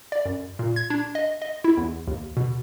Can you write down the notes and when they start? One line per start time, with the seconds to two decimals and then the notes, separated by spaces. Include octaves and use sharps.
0.12 D5
0.25 F#2
0.59 A#2
0.76 G#6
0.90 D4
1.15 D#5
1.42 D#5
1.64 E4
1.77 E2
2.07 D#2
2.37 B2